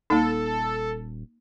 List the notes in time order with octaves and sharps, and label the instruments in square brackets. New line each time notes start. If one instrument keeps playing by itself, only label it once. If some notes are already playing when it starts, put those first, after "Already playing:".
[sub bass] D#1 [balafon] A#3 D#4 [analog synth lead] A4